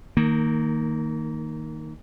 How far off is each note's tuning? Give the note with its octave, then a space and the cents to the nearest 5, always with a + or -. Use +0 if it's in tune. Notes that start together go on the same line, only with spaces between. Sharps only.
D#3 +0 A#3 -25